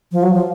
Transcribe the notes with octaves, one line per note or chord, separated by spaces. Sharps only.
F3
F#3
F3